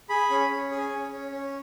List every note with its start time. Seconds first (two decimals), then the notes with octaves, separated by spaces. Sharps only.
0.09 G#4 B5
0.30 C#4
0.51 C#4
0.71 G#4
0.91 C#4
1.11 C#4
1.32 C#4